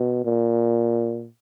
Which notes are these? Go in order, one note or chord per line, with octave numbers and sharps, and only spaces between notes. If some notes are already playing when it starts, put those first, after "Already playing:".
Already playing: B2
A#2